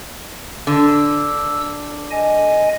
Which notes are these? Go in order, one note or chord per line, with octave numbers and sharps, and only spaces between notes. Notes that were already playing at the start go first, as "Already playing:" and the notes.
D3 E6
D#5 G#5